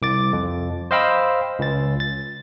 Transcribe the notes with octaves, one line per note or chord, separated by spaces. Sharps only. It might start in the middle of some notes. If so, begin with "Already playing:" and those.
C2 D6 A6
F2
C5 D#5 F5 G5 B5 E6
C#2 A6
A6